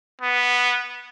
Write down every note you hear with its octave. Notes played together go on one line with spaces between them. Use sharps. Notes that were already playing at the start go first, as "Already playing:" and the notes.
B3